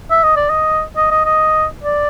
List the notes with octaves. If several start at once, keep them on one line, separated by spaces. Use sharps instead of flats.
E5
D#5
D5
D#5
D#5
D#5
D#5
D5